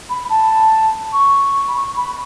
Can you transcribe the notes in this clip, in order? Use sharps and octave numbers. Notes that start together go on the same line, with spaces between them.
B5
A5
C#6
B5
C#6
B5